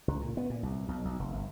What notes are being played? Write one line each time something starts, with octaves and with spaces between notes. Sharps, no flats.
C#2
A#2
B3
A#2
C2
B1
B1
F1
G1